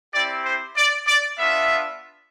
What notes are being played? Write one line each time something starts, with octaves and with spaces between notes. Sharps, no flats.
C4 E4 G4 D5
C5
D5
D5
B3 D4 F4 E5